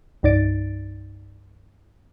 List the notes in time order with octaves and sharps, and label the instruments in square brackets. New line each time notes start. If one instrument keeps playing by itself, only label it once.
[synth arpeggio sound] C2 G2 D#4 D5 A6 D7